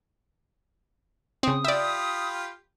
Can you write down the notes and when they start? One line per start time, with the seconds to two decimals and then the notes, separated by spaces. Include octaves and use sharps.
1.43 C#3 C4 D#6
1.65 F4 G4 D5 E5 B5